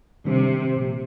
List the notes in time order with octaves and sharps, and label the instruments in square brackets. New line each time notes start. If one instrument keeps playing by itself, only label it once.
[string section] C3 [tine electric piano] D#3 G3 D4
[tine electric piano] A#2 F3 A#3